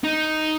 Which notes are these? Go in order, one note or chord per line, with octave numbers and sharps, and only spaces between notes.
D#4